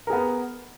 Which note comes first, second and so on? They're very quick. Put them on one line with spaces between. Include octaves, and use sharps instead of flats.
A#4 G#4 B3